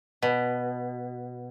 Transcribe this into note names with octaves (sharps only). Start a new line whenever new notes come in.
B2